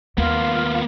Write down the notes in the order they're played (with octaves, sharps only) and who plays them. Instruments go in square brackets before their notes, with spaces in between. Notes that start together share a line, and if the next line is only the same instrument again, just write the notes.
[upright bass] D#2 [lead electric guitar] A#3 B3 [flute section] F4 F5